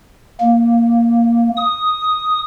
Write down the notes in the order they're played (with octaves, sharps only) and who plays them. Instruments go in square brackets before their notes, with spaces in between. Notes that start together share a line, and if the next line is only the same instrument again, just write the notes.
[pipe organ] A#3
D#6